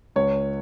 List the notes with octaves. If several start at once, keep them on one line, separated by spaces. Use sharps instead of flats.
C#2 C#5